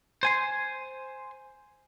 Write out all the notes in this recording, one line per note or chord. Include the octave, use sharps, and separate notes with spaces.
C5 G#5 C6